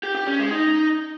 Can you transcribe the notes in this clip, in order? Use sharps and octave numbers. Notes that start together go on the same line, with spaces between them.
G4
G4
C#4
G#3
D#4